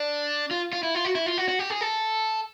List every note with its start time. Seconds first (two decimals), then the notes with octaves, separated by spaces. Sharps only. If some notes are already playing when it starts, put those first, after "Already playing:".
Already playing: D4
0.51 F4
0.73 F4
0.83 E4
0.95 F4
1.05 F#4
1.15 E4
1.26 F4
1.37 F#4
1.49 F#4
1.59 G4
1.70 G#4
1.81 A4